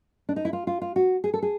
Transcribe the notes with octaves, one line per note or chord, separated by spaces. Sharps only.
D4
D#4
E4
F4
F4
F4
F#4
G#4
A4
G#4